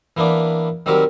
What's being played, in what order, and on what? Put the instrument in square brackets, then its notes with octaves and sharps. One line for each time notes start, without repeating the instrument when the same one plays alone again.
[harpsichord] E3 A#3 B3 D4 D5
D#3 F#3 G3 C4 G4 A#4